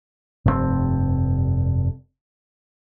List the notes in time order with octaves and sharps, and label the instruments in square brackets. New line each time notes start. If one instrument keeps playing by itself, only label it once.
[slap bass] F1 G2 B2 C4